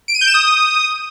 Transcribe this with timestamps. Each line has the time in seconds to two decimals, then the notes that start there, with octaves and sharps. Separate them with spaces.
0.08 D7
0.15 D#7
0.21 G6
0.28 E7
0.34 D#6